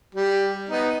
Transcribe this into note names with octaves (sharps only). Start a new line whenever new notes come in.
G3
B3 D#4